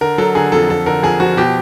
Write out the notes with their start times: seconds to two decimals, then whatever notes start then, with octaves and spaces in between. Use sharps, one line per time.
0.01 D3 A#4
0.18 F#3 A4
0.35 D3 G#4
0.52 F2 A4
0.69 F2 A4
0.86 D3 A#4
1.03 F2 G#4
1.20 F3 F#4
1.37 B2 G4